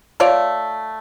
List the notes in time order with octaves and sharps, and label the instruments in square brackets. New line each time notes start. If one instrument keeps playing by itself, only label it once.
[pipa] A3 F4 C#5 D5